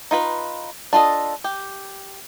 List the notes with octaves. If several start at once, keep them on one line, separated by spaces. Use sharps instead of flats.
D#4 F4 B4
D4 F4 A4 D#5
G4